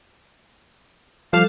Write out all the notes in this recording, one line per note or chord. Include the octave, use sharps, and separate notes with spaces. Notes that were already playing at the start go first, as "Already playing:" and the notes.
F3 G3 A4 F5